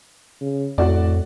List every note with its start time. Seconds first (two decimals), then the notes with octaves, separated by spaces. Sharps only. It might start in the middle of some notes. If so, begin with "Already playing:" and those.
0.41 C#3
0.78 F2 A2 F#4 D5